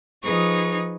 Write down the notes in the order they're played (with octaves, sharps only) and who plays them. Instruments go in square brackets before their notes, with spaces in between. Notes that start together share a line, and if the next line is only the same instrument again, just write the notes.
[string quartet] F3 D#4 G#4 B4 C#6